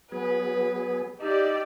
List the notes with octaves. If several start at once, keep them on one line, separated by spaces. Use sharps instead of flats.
F#3 B3 G#4 B4
D#4 G4 D5 E5